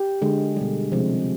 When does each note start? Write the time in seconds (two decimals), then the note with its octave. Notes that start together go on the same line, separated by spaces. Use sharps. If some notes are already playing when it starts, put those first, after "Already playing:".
Already playing: G4
0.22 D3 G#3
0.57 B2 G3
0.92 C3 F3 G#3